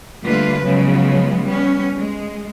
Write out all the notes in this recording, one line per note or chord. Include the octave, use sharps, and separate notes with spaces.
D3 G3 A3 A#3 F4 B4
C#3 F3 F#3 G#3 B3
G3 B3 C#4
G#3